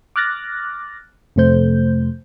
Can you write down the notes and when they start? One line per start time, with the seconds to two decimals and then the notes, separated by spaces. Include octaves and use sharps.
0.16 D6 F6 F#6 A6 A#6
1.36 F2 C3 A3 C5 G6